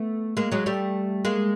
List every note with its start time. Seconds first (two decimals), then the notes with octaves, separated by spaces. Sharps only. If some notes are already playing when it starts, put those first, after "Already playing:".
Already playing: A3 B3
0.37 G#3 A#3
0.52 F#3 G#3
0.66 G3 A3
1.25 G#3 A#3